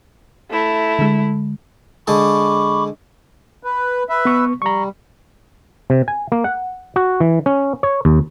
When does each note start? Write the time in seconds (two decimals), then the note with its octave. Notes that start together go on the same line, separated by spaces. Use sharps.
0.50 A3 E4
0.99 D3 G#3
2.07 D3 G#3 A5 B5 C#6 D6
3.63 B4
4.09 B4 E5
4.25 B3 C#6
4.62 G3 A#5 C#6
5.90 C3
6.08 G#5
6.32 A#3
6.44 F#5
6.96 F#4
7.20 E3
7.46 C#4
7.83 C#5
8.05 D#2